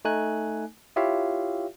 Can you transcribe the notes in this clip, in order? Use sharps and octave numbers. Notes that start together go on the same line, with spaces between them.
A3 D#4 G#5 F#6
E4 F4 G4 C#5 E5 F5